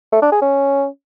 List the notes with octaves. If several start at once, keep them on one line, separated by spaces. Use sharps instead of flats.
A3
D4
G#4
C#4